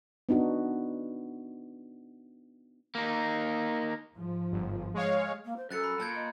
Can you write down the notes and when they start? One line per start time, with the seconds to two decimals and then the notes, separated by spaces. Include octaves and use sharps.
0.29 B3 D4 D#4 F#4
2.95 A#3 D#4
4.14 G#2 F3
4.52 G1
4.94 G#3 C#5 F5
5.44 A#3
5.56 C5
5.71 F#2 A4 F#6 A6 C#7
5.84 B5
6.00 A#2 A5 G6 G#6
6.15 D#5